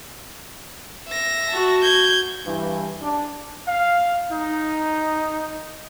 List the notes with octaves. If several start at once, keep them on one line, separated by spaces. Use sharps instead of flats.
E5 A#6
F#4 A5
G6 G#6
G2 E3
D4
F5
D#4